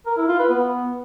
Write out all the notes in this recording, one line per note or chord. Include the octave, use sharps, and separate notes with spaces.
A#4
E4
F4
B4
B3